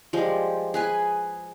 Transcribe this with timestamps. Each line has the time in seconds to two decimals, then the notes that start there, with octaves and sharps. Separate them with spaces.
0.13 F3 G3 G#3
0.74 G#4 B4 G#5